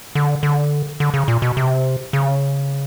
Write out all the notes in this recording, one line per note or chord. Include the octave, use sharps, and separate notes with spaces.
D3
D3
D3
C#3
A#2
B2
C3
C#3